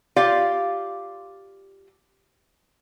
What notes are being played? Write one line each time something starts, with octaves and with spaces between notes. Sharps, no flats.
F4 G4 D5 F5